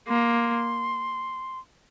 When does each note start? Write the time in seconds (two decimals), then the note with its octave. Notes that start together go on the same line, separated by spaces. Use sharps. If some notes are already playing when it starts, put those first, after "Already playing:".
0.08 A#3 C6